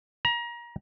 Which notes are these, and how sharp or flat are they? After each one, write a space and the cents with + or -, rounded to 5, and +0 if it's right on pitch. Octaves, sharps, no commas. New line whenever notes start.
A#5 +30